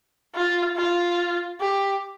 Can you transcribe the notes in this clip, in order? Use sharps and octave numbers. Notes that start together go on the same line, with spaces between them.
F4
F4
G4